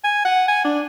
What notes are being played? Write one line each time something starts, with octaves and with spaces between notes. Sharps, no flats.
G#5
F#5
G#5
D4